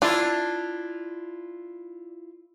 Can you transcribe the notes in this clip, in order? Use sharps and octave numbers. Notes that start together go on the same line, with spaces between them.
D4 E4 F4